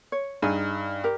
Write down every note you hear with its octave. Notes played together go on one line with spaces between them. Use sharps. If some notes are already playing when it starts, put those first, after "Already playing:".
C#5
G2 D#4 G#4 G#5
G4 A#4